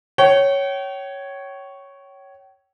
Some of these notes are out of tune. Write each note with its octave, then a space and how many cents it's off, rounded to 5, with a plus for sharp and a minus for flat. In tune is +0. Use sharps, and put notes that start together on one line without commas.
C#5 +0 G5 -40